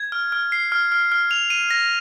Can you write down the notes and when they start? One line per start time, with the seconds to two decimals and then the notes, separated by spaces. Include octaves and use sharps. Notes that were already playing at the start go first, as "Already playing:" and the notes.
Already playing: G#6
0.12 F6
0.32 F6
0.52 C7
0.72 F6
0.92 F6
1.12 F6
1.31 F7
1.50 D#7
1.71 A#6